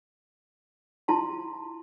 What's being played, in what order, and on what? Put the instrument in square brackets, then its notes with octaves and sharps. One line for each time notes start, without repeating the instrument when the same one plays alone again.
[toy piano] E4 F4 A5 C6